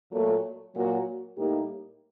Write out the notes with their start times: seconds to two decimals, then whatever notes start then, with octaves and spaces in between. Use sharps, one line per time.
0.11 A#2 F#3 A3
0.74 A#2 F#3 A#3 F#4
1.37 A2 G3 A#3 D#4 G4